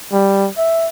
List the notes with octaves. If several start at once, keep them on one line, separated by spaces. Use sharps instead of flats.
G3
E5